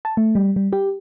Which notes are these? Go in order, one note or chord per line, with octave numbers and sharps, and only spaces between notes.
A5
A3
G3
G3
G4